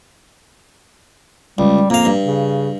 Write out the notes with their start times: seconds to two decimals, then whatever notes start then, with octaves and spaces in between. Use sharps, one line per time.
1.58 C#2 G3
1.90 F2 A#3 F5
2.05 G2
2.25 C#3